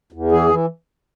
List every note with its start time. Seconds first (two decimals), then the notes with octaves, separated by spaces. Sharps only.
0.12 E2
0.32 E3 G#4
0.51 E3